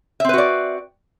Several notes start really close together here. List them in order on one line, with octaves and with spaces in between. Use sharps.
E5 C4 B4 F#4 D5